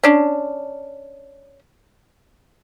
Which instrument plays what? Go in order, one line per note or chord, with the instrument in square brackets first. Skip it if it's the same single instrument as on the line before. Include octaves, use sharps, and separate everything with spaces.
[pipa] C#4 D4